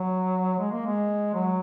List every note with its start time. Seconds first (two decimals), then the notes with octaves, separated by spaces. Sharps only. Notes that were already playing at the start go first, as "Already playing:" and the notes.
Already playing: F#3
0.59 G#3
0.72 A#3
0.86 G#3
1.34 F#3